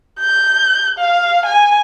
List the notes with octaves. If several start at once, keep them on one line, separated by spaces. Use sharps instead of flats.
G6
F5
G#5